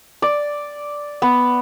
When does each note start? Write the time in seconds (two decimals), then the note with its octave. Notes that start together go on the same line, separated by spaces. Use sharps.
0.22 D5
1.22 B3